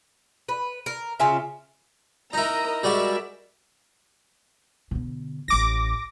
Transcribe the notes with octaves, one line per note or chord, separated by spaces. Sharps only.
B4
A#4
C#3 C#4 F4 E5
D#4 E4 A#4 D#5 A#5
G3 G#3 F#4 A#4 D5 E5
B2 D3
A1 E4 D6 A#6